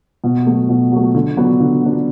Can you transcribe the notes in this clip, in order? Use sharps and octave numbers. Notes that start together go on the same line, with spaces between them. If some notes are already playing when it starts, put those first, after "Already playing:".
B2
F#3 A3
B2
F#3 A3
D3
F#3 B3 D4
D3
F#3 B3 D4